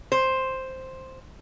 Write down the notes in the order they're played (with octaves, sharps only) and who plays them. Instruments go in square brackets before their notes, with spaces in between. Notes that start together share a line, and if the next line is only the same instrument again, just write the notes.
[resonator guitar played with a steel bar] C5